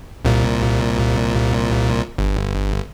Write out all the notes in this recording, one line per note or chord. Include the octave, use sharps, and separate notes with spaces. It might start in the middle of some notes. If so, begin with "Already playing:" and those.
C2 A#2
G1